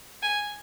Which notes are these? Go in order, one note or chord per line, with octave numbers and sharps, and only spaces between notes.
G#5